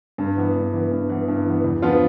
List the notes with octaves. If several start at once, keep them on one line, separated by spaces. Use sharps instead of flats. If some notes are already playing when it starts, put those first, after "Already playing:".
G2
E3 B3
G2
E3 B3
G2
E3 B3
G2
E3 B3
E2
D3 F3 B3 F4